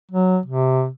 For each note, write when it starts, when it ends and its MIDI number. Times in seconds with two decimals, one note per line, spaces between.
0.12 0.39 54
0.46 0.89 48